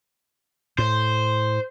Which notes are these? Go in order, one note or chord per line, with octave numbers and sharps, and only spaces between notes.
A2 C5